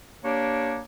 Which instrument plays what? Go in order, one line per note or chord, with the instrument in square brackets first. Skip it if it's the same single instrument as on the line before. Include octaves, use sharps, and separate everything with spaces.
[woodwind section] A#3 D4 G4 C#5